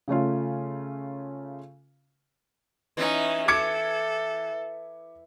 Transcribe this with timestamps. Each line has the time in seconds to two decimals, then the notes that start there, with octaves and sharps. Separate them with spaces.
0.08 C#3 A3 C#4 F4
2.97 E3 C#4 D#4
3.48 A4 D6 G#6 C#7